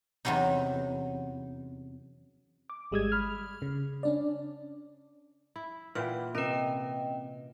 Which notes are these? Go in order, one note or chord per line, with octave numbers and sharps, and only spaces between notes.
E2 C3 F#3 C#4 D#4
D6
G#1 G3 G#3 D#6 E6 G#6
B5 F6
C#3
C#4 D4 D5
E4
A#2 E3 B4 F#5 G5 F6
C3 C#4 A#4 B4 D#5 G5